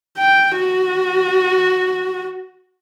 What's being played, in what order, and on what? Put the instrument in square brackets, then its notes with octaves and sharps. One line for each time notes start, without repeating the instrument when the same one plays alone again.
[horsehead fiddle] G5
F#4